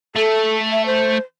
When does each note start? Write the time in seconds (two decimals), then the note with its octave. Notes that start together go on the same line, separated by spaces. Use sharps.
0.16 A3 A4
0.71 E5
0.86 C5